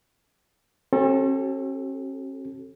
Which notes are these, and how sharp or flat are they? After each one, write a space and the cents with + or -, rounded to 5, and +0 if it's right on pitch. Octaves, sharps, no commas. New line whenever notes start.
C#4 -45 F#4 +45 A4 +0